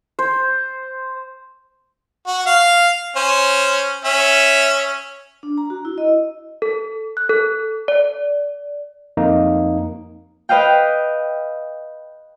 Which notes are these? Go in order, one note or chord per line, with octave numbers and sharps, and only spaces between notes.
C5
F#4
F5
C#4 C5
C#4 E5
D4
A#5
F#4
E4
D#5
A4
F#6
A4
D5
F2 A#3 D#4
B4 D#5 F5 G5